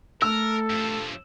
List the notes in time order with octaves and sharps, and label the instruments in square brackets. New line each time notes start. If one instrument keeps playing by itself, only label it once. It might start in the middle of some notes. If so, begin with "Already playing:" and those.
[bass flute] A3 [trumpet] A4 [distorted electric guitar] A#4 [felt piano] E6
[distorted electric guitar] G2 F3